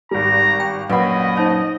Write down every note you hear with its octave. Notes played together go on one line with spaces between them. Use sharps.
G#1 G3 A#5
G5
A#1 F#2 A#2 B4 D#5 F#5 B5
D#4 C5 C#5